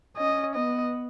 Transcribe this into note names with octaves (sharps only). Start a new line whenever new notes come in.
C#4 D#5
B3 D#5